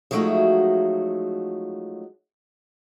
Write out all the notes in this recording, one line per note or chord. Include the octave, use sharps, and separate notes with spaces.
F3 F#3 G#3 A3 D#4 F#4